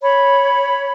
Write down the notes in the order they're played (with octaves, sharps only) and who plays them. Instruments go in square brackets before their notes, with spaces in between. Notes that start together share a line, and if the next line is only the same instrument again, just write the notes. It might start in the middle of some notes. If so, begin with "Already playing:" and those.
[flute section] C#5 B5